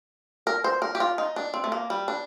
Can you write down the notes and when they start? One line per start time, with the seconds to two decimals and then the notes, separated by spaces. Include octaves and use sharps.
0.47 A#4
0.64 C5
0.82 A#4
0.95 G4
1.00 F4
1.18 D#4
1.36 D4
1.54 C4
1.64 A3
1.72 A#3
1.90 G3
2.08 D4